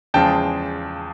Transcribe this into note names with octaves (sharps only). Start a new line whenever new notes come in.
E2 C#3 F3 G#3 G5 A5